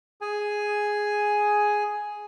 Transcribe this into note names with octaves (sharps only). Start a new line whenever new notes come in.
G#4 G#5